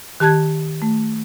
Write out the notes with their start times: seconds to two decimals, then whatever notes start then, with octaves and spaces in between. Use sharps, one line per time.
0.20 D#3 G4 A5 F#6 G#6
0.82 A3